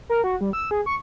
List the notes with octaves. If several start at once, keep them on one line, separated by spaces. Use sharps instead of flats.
A#4
F#4
G3
E6
G#4
C#6